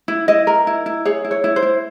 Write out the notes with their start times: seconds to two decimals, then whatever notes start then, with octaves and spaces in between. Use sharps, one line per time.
0.08 E4
0.28 E4 D#5
0.47 A#4
0.67 E4
0.86 E4
1.05 G#4 C#5
1.24 E4
1.31 C#5
1.44 E4
1.56 C5
1.63 E4